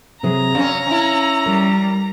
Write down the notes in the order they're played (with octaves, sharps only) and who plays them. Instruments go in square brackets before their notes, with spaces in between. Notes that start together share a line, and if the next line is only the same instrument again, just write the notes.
[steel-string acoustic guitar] C3 F#3 G#4 [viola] A#5
[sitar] F#2 C#4 [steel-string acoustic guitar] F5
[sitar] C#4 E4
[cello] G3 [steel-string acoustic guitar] A#4